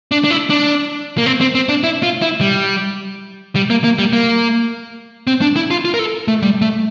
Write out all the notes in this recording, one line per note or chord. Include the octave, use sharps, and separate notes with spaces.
D4
D4
E4
D4
A#3
C4
C4
C4
D4
E4
F4
E4
G3
G3
A#3
A#3
G3
A#3
C4
D4
E4
F4
F4
A#4
A4
A3
G3
A3